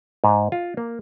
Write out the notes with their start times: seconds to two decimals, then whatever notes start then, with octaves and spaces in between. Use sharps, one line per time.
0.24 G#2
0.52 F4
0.77 A#3